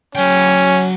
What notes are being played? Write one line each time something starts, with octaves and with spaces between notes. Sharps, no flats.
F#3 C#4 G5